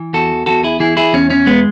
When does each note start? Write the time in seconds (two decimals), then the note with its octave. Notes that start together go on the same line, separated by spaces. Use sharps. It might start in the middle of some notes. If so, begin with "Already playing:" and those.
Already playing: E3
0.13 E2 F#4 A4
0.46 E2 F#4 A4
0.64 E4 G#4
0.80 E3 E4 G#4
0.97 E4 G#4
1.13 E2 C#4
1.30 C#4
1.46 G#3 B3